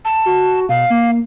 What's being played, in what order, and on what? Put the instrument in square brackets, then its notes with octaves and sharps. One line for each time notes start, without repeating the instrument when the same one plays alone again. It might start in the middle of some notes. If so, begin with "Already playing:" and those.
[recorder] A5
[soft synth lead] F#4
[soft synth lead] B2 [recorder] F5
[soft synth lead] A#3